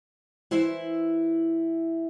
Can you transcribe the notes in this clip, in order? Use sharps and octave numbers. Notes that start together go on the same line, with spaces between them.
E3 E4 C5 E5